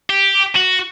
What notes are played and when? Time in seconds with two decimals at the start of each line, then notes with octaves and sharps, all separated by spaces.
0.10 G4
0.56 F#4